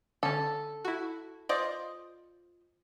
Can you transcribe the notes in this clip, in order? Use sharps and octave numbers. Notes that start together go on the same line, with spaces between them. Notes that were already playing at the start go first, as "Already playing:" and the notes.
D3 C#4 A4
E4 F#4
F4 C5 D5 D#5